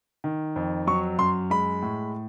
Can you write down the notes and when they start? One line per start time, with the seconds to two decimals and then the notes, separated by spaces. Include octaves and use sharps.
0.24 D#3
0.56 F2
0.87 F#3 C#6
1.18 F#2 C6
1.50 G#3 B5
1.82 A2